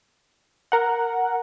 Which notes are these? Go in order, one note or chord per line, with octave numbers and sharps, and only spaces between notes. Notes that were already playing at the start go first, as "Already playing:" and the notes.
A#4 F#5